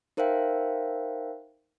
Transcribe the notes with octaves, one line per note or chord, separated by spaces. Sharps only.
D#4 A#4 C5 E5 F5 G5